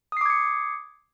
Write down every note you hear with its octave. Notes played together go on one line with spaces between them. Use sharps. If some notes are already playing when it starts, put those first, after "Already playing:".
D6 D#6 G#6 C7 C#7